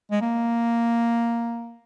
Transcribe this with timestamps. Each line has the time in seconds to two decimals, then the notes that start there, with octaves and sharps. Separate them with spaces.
0.11 G#3
0.21 A#3